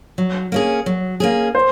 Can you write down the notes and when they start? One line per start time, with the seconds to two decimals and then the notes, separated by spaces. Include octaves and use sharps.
0.18 F#3
0.52 A#3 C#4 G#4
0.86 F#3
1.20 A#3 C#4 G#4
1.55 C5